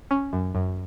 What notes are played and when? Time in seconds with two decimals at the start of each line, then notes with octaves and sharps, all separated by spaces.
0.11 C#4
0.33 F#2
0.55 F#2